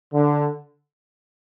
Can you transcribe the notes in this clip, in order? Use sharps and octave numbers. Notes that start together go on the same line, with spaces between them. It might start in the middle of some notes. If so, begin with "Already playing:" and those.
D3